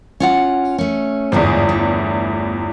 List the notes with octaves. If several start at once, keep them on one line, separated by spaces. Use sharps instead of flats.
C#4 F4 F#5
A3 C#4
G1 E2 G#2 G#3 G#4
A3